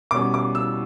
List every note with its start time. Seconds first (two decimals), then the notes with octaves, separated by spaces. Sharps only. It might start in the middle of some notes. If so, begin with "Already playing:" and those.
0.11 B2 G3 C#4 D6
0.34 D6
0.55 E6